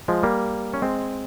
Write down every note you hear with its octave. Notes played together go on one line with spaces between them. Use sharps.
F3 G#3
G3 A#3
C#4
G#3 C4